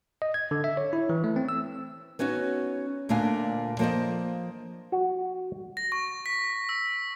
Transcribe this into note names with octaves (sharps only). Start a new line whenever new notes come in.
D#5
G#6
D3
E5
C#5
E4
E3
A3
C4
E6
B3 C#4 D#4 F#4 C#5
D2 A#2 D4 F5 G#5
F3 A#3 C5 D5 D#5
F#4
A#6
C#6
B6
E6